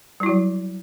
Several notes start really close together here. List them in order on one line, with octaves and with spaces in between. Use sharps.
G3 E4 F#4 F#3